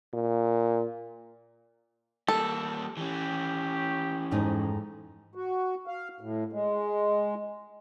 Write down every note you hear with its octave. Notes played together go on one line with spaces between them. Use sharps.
A#2
G3 A#3 A4
E3 C#4 G4
F2 G#2 D#4
F#4
F5
A2
G#3